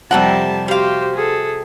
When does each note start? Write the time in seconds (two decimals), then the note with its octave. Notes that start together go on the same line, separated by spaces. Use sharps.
0.11 F2 C3 G3 A3 A4 A#4 F#5 A5
0.68 G3 F#4 G4 C5 F5
1.14 G#4 A4